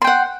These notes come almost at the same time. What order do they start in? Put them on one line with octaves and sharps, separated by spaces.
C6 G5 F#5